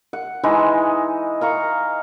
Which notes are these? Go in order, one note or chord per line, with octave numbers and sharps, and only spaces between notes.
F#5
E3 G#3 D#4
F5 A#5 C#6